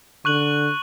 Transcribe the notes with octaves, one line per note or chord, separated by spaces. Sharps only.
D3 C#6 F#6 F#7